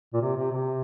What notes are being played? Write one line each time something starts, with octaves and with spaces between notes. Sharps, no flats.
A#2
C3
C3
C3